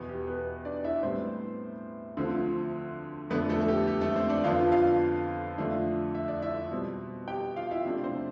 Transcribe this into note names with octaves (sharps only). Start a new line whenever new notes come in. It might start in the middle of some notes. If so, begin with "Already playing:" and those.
Already playing: E2 B2 B3
G4
B3 B4
D4 D5
E4 E5
A2 G3 B3 C4 C5
D2 D3 F3 C4 F4
F2 D3 A3 B3 D4 B4
A3 A4
A4
G4
G4
A3 A4
C4 C5
D4 D5
F2 D3 F3 B3 D4 F4 F5
F4 F5
F2 D3 A3 D4 F4
E5
D5
E4 E5
B2 G3 C4
G4 G5
F4 F5
E4 E5
C3 F3 A3 D4 F4
C4 C5